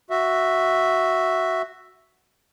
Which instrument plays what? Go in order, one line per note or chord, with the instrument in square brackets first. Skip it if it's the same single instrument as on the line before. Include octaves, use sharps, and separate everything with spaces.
[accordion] F#4 E5